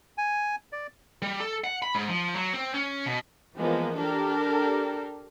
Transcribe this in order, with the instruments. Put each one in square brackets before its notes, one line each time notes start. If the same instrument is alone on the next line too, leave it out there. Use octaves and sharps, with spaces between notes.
[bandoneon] G#5
D5
[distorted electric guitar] G3
A4
F#5
B5
G#2
F3
F#3
C4
C#4
B2
[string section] E3 F3 G#3 A#3 B3
D4 G4 A4 A#4